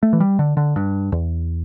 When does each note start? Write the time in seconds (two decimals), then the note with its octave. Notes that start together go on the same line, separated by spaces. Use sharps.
0.03 A3
0.13 E3
0.20 G3
0.39 D3
0.57 D3
0.76 G2
1.12 E2